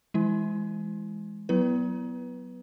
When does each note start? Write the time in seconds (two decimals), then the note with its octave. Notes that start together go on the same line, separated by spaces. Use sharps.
0.14 E3 G#3 E4
1.49 F#3 B3 E4 B4